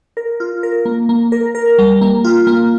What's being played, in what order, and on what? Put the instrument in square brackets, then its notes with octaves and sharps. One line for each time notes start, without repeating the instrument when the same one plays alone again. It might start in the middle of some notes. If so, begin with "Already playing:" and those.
[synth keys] A#4
F4
A#4
A#3
A#3
A#4
A#4
G3
A#3
F4
A#3